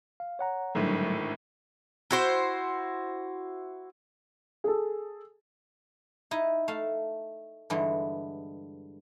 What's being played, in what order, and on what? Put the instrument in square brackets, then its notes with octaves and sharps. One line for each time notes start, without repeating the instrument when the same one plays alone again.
[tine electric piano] F5
C#5 F#5 A#5
[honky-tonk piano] G#1 A2 D3 [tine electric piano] F#3 G3 A3
[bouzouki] E4 F#4 C5
[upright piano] G#4 A4
[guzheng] D#4 E4 D#5
A3 F5 A5
G2 D3 E3 G#3